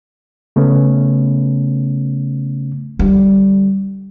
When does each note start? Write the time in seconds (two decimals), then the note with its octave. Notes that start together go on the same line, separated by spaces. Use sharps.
0.56 C#3 A3 B3 C#4
2.99 D3 G3